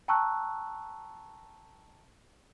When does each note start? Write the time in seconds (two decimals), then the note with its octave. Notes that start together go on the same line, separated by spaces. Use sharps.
0.08 G5 A5 A#5 C#6 E6 F#6